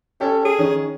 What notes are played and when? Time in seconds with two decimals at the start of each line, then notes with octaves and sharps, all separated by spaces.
0.21 C#4 G4 A4
0.45 G#4
0.59 D#3 C#4